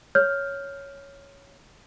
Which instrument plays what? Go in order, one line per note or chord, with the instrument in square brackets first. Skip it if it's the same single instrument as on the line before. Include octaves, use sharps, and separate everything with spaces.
[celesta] C#5 F6 G6